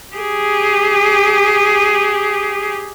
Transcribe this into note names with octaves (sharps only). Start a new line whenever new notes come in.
G4 G#4